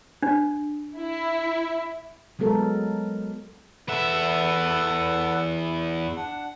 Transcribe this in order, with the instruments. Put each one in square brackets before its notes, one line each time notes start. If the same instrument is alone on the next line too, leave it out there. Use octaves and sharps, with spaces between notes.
[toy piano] D4
[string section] E4
[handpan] F#3 G#3 B3 A4 A#4
[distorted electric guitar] E2 E5 [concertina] A4 B4 F#5
[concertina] D4 F#5